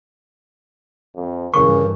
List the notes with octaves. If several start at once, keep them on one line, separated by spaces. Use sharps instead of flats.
F2
G2 C#3 E3 A#4 C#6